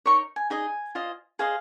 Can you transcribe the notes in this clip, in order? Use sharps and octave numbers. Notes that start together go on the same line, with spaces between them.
D#4 A#4 C#5 C#6
G#5
D#4 G#4 D#5 G#5
F4 C5 D#5
G#4 C5 D#5 F5